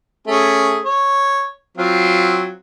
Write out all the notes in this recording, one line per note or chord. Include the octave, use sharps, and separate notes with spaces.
A3 C#4 G#4
C#5
F#3 C4 F4